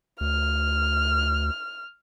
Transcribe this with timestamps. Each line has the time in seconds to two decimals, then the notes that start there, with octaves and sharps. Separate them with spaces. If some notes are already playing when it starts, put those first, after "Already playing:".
0.21 D2 F6